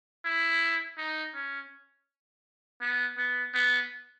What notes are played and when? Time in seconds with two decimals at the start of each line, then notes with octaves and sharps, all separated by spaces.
0.25 E4
0.98 D#4
1.34 C#4
2.81 B3
3.18 B3
3.54 B3